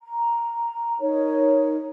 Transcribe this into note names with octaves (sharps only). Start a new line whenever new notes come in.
A#5
D#4 A#4 C#5